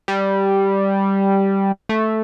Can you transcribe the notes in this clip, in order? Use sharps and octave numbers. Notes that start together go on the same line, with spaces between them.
G3
A3